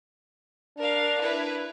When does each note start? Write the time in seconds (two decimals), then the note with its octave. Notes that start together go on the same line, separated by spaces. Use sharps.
0.78 D4 A#4 F5
1.20 E4 B4